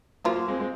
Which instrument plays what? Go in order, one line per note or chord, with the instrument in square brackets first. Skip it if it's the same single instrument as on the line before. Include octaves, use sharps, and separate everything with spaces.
[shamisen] F3 F4 [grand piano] F#3 A#3
[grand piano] F#3 A#3
G#3 C4
G#3 C4